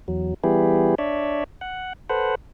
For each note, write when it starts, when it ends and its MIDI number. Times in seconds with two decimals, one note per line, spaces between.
0.08 0.34 40
0.08 0.34 54
0.44 0.95 52
0.44 0.95 55
0.44 0.95 59
0.44 0.95 64
0.44 0.95 67
0.44 0.95 68
0.98 1.44 62
0.98 1.44 73
0.98 1.44 74
0.98 1.44 76
1.61 1.93 78
2.09 2.35 69
2.09 2.35 71
2.09 2.35 72
2.09 2.35 78